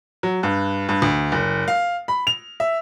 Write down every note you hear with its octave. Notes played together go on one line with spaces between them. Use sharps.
F#3
G2
G2
D2
F#1
F5
B5
F7
E5